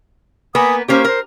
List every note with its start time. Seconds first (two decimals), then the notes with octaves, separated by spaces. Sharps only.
0.55 A#3 B3 B4 F#5 G#5 D#6
0.88 A#3 C#4 G4 C5 C#6
1.05 A#4 C5